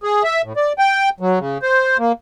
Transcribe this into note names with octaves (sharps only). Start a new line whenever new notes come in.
G#4
E5
A2
D5
G5
F#3
C#3
C5
A#3